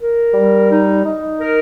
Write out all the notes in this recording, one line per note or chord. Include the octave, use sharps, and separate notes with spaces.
A#4
G3
D#4
D#4
A#4